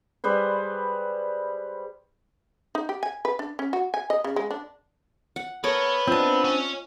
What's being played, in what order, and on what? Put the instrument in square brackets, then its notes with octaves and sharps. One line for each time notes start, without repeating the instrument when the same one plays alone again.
[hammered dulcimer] G3 G#4 B4 C5
[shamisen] D#4
G4
G#5
B4
D4
C#4
F#4
G#5
D#5
C#3
G#3
D4
[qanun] F#5
[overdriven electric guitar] B3 [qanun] A4 A#4 C#5
[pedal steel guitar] C4 D4 [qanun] F4 D#5
[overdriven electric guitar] C#4